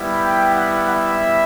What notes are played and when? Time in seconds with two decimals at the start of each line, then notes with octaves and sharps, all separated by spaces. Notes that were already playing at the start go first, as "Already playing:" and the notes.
Already playing: G3 B3 E4
0.19 G5
0.54 F#5
0.89 E5